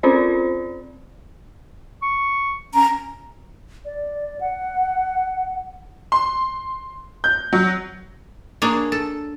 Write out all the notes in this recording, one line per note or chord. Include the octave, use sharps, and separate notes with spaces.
C4 C#4 F4 C5 D5
C#6
C#4 A#5
D5
F#5
C6
G6
F#3
A#3 D4 G#4 C#5
A4